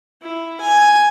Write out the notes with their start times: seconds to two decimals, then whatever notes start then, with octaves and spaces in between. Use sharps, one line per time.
0.22 E4
0.61 G#5